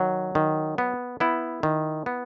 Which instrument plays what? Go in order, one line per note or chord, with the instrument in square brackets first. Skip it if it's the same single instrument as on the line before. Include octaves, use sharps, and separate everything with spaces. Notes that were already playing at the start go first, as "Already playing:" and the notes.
Already playing: [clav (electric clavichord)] D#3 F#3
D#3
B3
B3 E4
D#3
B3